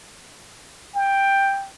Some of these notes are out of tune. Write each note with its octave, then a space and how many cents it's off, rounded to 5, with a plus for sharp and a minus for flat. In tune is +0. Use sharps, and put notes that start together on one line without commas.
G5 +5